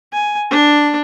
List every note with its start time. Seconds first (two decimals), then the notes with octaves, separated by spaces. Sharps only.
0.13 G#5
0.50 D4